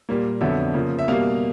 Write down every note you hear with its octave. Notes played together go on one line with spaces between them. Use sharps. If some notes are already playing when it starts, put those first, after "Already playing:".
A#2 G3 A#3
F2 D3 F#3 B3 E5
C#3 F3 A#3
E5
B2 G3 A#3 F5